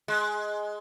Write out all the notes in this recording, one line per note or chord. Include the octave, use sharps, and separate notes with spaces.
G#3